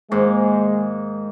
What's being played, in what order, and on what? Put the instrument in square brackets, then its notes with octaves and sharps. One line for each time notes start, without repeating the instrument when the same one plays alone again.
[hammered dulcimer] G#2 D#3 A#3 [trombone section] G#3